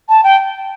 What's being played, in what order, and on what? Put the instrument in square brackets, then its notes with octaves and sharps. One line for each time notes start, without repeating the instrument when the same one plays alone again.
[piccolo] A5
G5